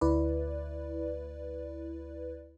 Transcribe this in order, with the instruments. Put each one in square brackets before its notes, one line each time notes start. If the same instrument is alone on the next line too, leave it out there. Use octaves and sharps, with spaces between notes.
[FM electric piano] D2 E4 B4 D5